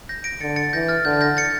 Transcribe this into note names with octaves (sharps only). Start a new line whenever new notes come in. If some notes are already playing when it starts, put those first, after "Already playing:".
G6 A#6
A#6 D7
D3 A6 C#7
A6 C#7
E3 G6 A#6
F6 A6
D3 G6
G6 A#6
A6 C#7